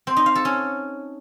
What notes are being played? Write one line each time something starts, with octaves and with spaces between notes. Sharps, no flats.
C4
D#4
F5
A4
C#4